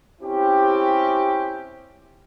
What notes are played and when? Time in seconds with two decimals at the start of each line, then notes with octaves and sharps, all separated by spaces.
0.21 C4 C#4 E4 G4